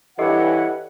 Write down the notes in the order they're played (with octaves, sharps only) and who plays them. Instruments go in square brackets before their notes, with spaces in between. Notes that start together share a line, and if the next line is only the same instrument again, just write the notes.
[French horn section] G2 E3 [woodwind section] E4 C#5 F#5 [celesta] G4 A4 D#5